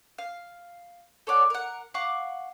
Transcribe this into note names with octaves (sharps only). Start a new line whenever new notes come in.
F5
A4 C#5 D5 F#5
A#4 F#5
F5 F#5 C#6 D6